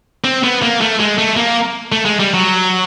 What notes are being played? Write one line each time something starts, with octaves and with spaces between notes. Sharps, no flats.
C4
B3
A#3
A3
G#3
A3
A#3
A3
G#3
G3
F#3